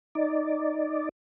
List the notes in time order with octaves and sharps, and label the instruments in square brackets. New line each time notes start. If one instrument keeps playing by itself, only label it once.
[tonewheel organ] D#4 D5